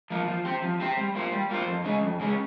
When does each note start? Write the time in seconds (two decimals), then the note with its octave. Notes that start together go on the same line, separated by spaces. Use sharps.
0.10 F3 A#3 F4
0.28 F3
0.45 C4 G4 C5
0.62 F3
0.80 C4 G4 C5
0.97 G3
1.15 A#3 F4 C5
1.32 G3
1.50 A#3 F4 C5
1.66 F2
1.84 C#3 G#3 C#4
2.01 F2
2.20 C#3 G#3 C#4